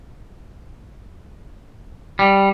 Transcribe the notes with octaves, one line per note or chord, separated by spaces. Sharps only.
G3